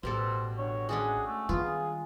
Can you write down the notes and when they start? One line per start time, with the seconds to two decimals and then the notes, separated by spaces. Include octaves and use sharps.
0.03 A1 B2 G3 A4 C5
0.58 D3 C#5 G5
0.89 G#3 C#4 D4 F#4 G#4 C#6 D6
1.26 A3
1.49 D#3 G3 B3 F4 G#4
1.62 G#4 A#5